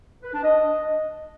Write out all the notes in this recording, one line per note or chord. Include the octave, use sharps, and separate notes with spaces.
B4
D4
D#5